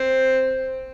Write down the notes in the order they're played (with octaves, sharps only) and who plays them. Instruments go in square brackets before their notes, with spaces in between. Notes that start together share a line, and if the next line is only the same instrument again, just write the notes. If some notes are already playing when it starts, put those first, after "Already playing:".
Already playing: [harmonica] C4